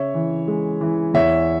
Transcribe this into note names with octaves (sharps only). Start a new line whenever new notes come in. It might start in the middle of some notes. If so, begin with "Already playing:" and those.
Already playing: C#3 C#5 E5
E3
G#3
E3
E2 C#5 E5